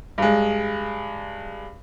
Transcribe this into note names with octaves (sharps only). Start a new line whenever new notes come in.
G2 G#3